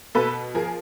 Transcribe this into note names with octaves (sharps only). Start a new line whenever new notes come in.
B2 A4 B4
F3 G#4 A#4